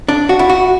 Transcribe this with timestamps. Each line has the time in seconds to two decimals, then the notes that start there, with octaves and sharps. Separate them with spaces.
0.08 D4
0.29 F#4
0.39 E4
0.49 F#4